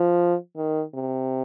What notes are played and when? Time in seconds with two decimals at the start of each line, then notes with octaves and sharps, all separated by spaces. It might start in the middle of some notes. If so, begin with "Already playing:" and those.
Already playing: F3
0.57 D#3
0.94 C3